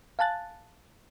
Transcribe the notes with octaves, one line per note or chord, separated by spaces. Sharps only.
F5 G#5 A5 F#6 A6